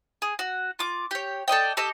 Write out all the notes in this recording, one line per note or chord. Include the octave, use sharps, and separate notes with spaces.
G#4
F#4
F4 D6
G4 C#5
A4 D5 D#5 G5
G4 A4 D#5